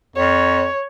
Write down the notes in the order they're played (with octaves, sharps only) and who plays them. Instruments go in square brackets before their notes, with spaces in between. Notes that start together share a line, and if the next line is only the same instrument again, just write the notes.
[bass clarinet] F2 [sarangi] C#5